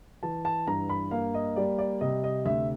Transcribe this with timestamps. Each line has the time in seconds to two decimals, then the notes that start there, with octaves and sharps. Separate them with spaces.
0.23 E3 A5
0.45 A5
0.67 G2 A#5
0.89 B5
1.11 A#3 F5
1.34 D#5
1.56 G3 D5
1.78 D5
2.01 C3 D#5
2.24 D#5
2.45 D2 E5